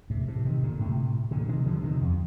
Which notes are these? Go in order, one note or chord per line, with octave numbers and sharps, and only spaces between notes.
A2 C3
A2 C3
C3 D#3
A#2 D3
A2 C3
A#2 D3
C3 D#3
D3 F3
C3 D#3
F2